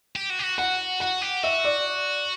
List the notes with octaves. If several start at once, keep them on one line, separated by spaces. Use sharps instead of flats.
G4
F#4
G4
F#4
F#4 F#5
F#4 F#5
G4
F#4 E5
D5